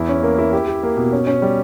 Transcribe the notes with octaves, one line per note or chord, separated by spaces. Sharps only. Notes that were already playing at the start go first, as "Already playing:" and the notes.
Already playing: E2 E4
C#4
A#3
E4
G4
G4
A#3
B2
C#4
C#4
G3